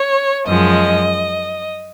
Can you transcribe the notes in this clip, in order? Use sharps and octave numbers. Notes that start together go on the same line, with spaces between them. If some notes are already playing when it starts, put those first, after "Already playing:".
Already playing: C#5
F#2 F3 G#3 D#5